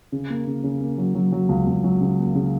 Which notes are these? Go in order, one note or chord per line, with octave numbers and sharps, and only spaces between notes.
C#3
A#3
C#3
C#3
A#3
F#3
F#3
F#3
C#2
C#2
F#3
C#3
A#3
C#3